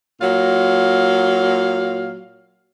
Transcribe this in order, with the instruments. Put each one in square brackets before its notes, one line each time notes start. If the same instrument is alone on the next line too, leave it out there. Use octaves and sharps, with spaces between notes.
[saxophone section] A#2 F#3 F5